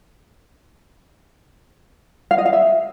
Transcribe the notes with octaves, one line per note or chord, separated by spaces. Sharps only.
F5
D#5
F5
E5